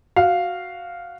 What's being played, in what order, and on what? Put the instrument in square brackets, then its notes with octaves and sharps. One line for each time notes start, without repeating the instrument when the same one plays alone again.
[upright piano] F#4 F5